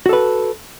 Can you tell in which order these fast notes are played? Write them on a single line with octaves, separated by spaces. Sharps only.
F#4 A4 B4